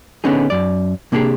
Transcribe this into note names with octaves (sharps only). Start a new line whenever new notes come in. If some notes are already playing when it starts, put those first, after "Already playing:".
D3 B3 C#4 D#4 G#4
F#2 D5
C3 A#3 D4 D#4 G4 G#4